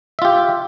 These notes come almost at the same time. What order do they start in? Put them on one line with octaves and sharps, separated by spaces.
E5 F4 G4